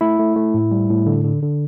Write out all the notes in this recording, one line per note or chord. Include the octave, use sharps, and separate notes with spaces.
A3 E4
A3
A3
A2
G3
A2
D3
D3
D3